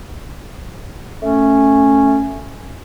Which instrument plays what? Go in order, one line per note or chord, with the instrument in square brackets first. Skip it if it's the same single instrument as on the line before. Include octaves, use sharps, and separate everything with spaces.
[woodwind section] A3 C#4